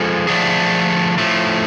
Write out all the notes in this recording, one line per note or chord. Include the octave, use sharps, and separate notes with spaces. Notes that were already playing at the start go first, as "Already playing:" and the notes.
Already playing: F3 G#3 A4
D3 F3 A3 D4 G#4
A2 F3 A3